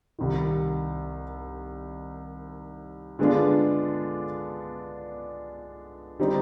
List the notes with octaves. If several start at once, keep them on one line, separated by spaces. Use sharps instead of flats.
C2 C3 D#3
D3 G#3 B3 D4 F4
D3 G3 C4 D#4